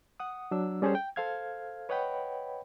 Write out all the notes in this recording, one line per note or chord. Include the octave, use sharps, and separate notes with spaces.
F#5 D#6
F#3 D4 E6
G3 C#4 G#4 A4 C5 C#5
G5
A4 C5 F5 F6 G#6
B4 C#5 D#5 F#5 G5 B5